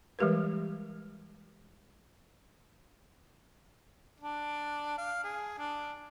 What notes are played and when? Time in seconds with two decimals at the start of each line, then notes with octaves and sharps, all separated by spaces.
0.19 E3 G3 G#3 G4 A#4 B4
4.20 D4
4.97 F5
5.24 G#4
5.58 D4